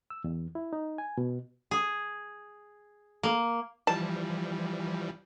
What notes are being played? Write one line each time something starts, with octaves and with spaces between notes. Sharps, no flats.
E6
E2
E4
D#4
G#5
B2
G#4
A#3
E3 F3 G3 A5